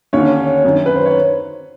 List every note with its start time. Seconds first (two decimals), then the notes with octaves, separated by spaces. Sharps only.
0.13 D#2 D3 C#4 C#5
0.64 F#2 D#3
0.86 B4
0.96 C5
1.05 C#5